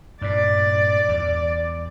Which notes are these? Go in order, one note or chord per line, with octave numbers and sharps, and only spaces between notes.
G2 A#2 D5
E2